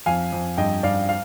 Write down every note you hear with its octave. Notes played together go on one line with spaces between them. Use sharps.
F2 F5 G#5
F2
G2 D#5 G5
G2 D5 F5
F5